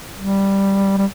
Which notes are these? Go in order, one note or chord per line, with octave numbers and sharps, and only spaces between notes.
G3
G3